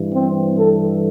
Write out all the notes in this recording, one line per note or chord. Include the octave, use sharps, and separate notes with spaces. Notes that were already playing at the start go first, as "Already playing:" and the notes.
Already playing: G2 E3
C4
A4